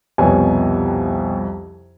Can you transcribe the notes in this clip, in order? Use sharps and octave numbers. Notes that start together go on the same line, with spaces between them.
C2 F2 B2 C#5 G#5